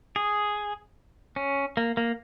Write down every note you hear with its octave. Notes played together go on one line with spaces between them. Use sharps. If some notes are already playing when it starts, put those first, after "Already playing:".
G#4
C#4
A#3
A#3